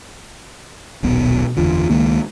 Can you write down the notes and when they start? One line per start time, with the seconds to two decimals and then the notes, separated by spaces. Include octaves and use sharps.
1.03 D#1 B1 B2 B3
1.57 F#1 E2 D3 F4
1.90 C#2 D#3 G#3 A#3